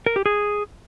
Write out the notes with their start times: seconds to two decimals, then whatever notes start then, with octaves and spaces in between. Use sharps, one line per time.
0.06 A#4
0.16 G4
0.26 G#4